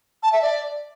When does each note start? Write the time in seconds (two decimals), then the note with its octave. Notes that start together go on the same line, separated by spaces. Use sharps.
0.23 A5
0.32 E5
0.42 D5